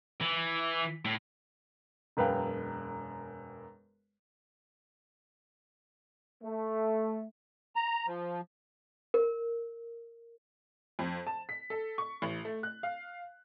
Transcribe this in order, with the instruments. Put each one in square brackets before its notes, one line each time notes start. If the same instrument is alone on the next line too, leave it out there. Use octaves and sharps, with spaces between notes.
[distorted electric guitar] E3
A2
[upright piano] E1 F#2 B4 F5 G5
[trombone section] A3
[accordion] A#5
F3
[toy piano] A#4
[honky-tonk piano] F2
A5
B6
A4
C#6
A1
A3
F#6
F5